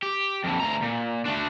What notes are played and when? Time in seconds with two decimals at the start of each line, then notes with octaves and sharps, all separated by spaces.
0.03 G4
0.44 F2 D3
0.60 D2 A#5
0.83 A#2
1.25 A3 D4